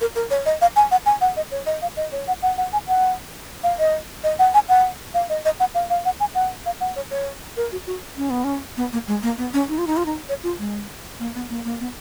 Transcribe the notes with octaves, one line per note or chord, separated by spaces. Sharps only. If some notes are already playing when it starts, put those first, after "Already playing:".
A#4
A#4
C#5
D#5
F5
G#5
F#5
G#5
F#5
D#5
C#5
D#5
F5
D#5
C#5
F#5
F#5
F#5
G#5
F#5
F5
D#5
D#5
F#5
G#5
F#5
F5
D#5
D#5
F#5
F5
F5
F#5
G#5
F#5
F5
F#5
C#5
C#5
A#4
F#4
F#4
C#4
B3
C#4
B3
A#3
G#3
A#3
B3
C#4
D#4
F4
D#4
F4
D#4
C#5
F4
G#3
A#3
B3
A#3
A#3
B3